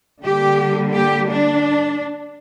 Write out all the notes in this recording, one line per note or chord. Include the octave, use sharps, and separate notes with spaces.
D3 G3 A#3 G4
G4
D4